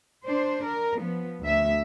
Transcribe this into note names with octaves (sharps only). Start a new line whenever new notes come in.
D4 C5
A#4
F3 B3
D2 E5